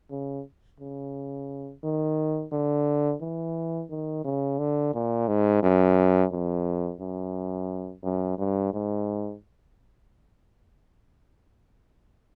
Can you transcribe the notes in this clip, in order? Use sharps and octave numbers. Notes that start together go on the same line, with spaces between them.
C#3
C#3
D#3
D3
E3
D#3
C#3
D3
A#2
G#2
F#2
F2
F#2
F#2
G2
G#2